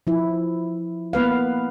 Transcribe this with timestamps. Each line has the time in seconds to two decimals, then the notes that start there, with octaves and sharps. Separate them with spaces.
0.07 F3 E4
1.13 A#3 B3 B4 F5